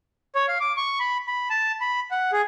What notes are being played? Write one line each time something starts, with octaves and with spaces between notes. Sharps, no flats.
C#5
F5
D6
C#6
B5
B5
A5
B5
F#5
G#4